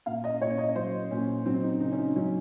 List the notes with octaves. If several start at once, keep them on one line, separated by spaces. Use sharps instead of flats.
A#2 F5
D#5
A#2 C#5
D#5
F#3 C5
A#2 C#4
F#3 C4
D#4
C#3 D#4
C#4
D#4
F#3 C#4